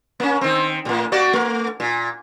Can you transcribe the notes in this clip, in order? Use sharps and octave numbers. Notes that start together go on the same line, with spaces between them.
A#3 C#4
D#3 C4
A2 A#3
A#3 F#4 D5
A3
A#2